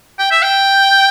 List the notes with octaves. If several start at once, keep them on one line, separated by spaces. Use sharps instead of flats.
G5
E5
G5